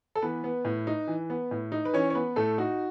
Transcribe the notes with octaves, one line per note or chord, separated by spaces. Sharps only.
A4
E3 B3 B4
B3
A2
D#4
E3
B3
A2
D#4
B4
E3 C#4 C#5
C#5
B3 B4
A2 A3 A4
D#4 F#4